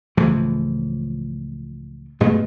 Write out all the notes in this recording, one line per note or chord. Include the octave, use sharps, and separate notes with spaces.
C#2 A2 E3 F3
G2 B2 G#3 A3